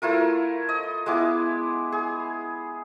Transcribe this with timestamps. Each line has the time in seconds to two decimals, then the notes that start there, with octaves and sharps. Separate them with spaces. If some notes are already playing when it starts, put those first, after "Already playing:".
0.02 A3 E4 F4 A#4
0.69 D#5
1.06 G#3 B3 E4 D6
1.92 G#4